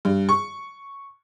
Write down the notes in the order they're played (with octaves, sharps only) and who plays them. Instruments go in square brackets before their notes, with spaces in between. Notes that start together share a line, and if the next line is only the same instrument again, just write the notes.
[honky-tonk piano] G2
C#6